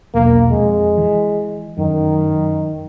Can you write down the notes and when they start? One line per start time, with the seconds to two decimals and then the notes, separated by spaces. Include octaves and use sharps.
0.14 E1 B1 A#3
0.51 F2 G#3
0.98 E3
1.78 F#2 D#3